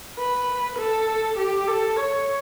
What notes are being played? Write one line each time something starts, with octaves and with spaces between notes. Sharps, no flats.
B4
A4
G4
A4
C#5